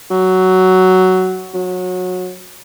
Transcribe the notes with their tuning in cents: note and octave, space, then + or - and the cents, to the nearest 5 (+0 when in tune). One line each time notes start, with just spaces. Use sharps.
F#3 +10
F#3 -20